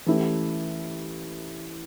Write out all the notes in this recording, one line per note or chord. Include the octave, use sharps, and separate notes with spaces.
E3 A3 C#4 E4 G4